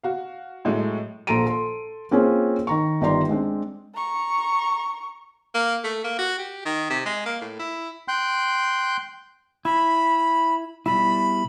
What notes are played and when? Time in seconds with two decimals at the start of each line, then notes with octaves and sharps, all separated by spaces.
0.03 F#4 F5
0.65 A2 F#3 G#3 A3
1.27 A#1 A4 A#5 C6 D7 D#7
1.46 A4 C6
2.11 A#3 C4 C#4 F4 G#4 C5
2.67 D#3 A#5 C#6
3.01 G1 D#3 G4 D5 A#5 C6
3.29 G#3 C4 D4
3.95 A#5 C#6
5.54 A#3
5.84 A3
6.04 A#3
6.19 F#4
6.39 G4
6.65 D#3
6.90 C3
7.06 G#3
7.26 A#3
7.41 A2
7.59 E4
8.08 G5 C6 F#6 G6
9.65 E4 B5
10.86 B2 G3 E4 B5